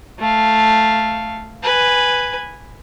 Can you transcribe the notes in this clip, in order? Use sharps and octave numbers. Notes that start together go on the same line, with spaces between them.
A3 F5
B4 G#5